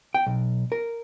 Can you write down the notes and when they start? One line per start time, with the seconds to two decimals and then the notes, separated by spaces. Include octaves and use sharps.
0.14 G5
0.26 B1
0.72 A#4